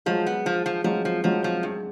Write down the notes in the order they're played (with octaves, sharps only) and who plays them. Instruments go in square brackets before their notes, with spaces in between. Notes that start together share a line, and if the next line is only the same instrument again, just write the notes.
[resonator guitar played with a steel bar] F3 [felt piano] F#3 G#3
[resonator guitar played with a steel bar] B3
F3
F3
[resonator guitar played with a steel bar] F3 [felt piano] F#3 G#3
[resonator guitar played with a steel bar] F3
[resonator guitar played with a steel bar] F3 [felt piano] F#3 G#3
[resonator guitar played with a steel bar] F3
G2